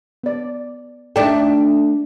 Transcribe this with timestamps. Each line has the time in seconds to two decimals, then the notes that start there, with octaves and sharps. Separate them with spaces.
0.24 B3 D5
1.16 A3 D4 D#4 D5 G5